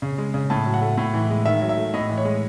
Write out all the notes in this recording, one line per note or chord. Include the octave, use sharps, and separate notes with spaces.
C#3
G#3
C#3
A2 A5
F#3
F#5
A3
A2
E3
G#3
D#3 E5
F#3
E5
A3
A2 D#5
E3
C#5
G#3